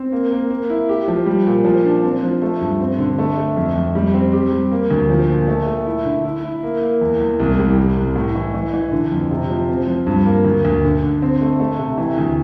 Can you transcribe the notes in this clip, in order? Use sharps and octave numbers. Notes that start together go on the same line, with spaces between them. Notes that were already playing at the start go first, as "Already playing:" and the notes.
Already playing: C4
A#3
A#3
A#3
E4
G4
F3
G3
A#2
F3
D4
C4
F3
A3
G2
C4
D3
A3
A3
F2
F2
G3
C4
G4
G3
A#3
D2
F3
A#2
A3
A3
E4
D3
E4
E4
A#3
A#3
E2
E2
C2
G3
C2
C2
A2
E3
E3
E3
D3
F2
C3
F3
C4
F3
G2
A#3
D2
D2
D3
D3
C4
A3
A3
C3
E3
D2